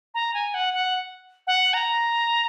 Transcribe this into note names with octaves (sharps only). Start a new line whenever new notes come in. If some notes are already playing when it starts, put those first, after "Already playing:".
A#5
G#5
F#5
F#5
F#5
A#5